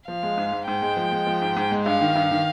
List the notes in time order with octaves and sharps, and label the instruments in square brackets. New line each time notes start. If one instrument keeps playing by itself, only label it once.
[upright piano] F3 [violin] F5
[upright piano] G#3
G#2
G#2
[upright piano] G#2 [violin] G5
[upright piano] G#3
F3
G#3
F3
G#2
G#2
G#3
[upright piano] G2 [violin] F5
[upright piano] D#3
G2
D#3